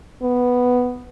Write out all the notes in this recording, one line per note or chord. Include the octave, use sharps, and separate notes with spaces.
B3